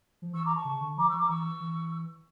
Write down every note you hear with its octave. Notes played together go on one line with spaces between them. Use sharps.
F3
E3 C#6 E6
A#5 D6
A5 C#6
C#3
D3
F3 A#5 D6
C#6 E6
F3
A#5 D6
E3 C#6 E6
E3